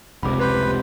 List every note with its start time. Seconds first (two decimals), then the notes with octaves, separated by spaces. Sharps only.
0.23 F1 C#2 C3 B5 D6
0.39 G4 B4 C6 G6